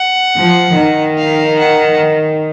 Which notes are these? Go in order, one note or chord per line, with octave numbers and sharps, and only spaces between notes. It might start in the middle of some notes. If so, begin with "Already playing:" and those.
Already playing: F#5
F3
D#3
F5
F#5